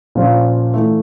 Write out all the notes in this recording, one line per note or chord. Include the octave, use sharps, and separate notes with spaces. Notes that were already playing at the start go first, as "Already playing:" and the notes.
A#2 F3 C#4 F4
E3 A3